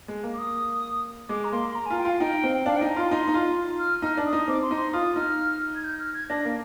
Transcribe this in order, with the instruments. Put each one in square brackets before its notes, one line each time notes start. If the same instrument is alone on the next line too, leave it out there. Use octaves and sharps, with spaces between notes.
[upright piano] G#3
A#3
[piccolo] D6
D#6
[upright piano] G#3 [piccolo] D6
[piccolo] A#5
[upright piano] A#3 [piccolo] C6
[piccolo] C6
A#5
G#5
[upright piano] F4
[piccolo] G5
[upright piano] F4 [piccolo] F5
[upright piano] D#4 [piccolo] G5
[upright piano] C4
[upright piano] D4 [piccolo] F5
[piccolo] G5
[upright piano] D#4
[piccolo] A#5
[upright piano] F4 [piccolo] C6
[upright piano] D#4 [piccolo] C6
[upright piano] D#4
[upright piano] F4 [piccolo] C6
[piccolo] F6
[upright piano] D#4 [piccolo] F6
[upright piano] D4
[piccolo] D#6
[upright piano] D#4
[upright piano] C4 [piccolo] D6
[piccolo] C6
[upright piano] D#4
[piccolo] C6
[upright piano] F4 [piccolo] D#6
[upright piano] D#4 [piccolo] F6
[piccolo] G#6
G6
F6
G#6
[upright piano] D4 [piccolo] A#6
[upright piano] A#3